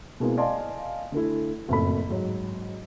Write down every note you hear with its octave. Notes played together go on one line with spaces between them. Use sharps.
B2 G#3 A#3 C4 E4
D5 D#5 F5 G#5 A5 C6
D3 A3 E4
F#1 F2 A2 A4 B5
G#2 F#3